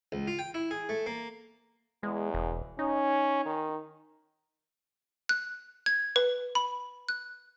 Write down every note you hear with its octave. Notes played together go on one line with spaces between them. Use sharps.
C#2
F4
G5
E4
G#4
A3
A#3
E2 G#3
E1
C#4 D#4
D#3
F#6
G#6
B4
B5
F#6